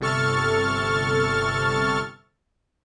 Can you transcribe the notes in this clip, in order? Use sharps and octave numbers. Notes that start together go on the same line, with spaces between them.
G1 C3 A4 C#6 F6 A6